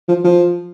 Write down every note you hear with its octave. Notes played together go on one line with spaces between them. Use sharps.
F3
F3